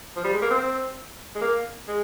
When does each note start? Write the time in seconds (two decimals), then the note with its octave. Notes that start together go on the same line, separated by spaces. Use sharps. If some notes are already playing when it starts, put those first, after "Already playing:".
0.16 F3
0.24 G3
0.33 G#3
0.42 A#3
0.50 C4
1.35 G#3
1.41 A#3
1.88 G#3